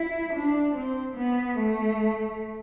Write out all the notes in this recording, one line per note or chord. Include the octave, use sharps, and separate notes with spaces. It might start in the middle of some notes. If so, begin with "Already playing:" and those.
Already playing: E4
D4
C4
B3
A3